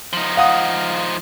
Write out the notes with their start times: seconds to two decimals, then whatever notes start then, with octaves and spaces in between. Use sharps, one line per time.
0.13 F3 D#4
0.37 F5 F#5 D#6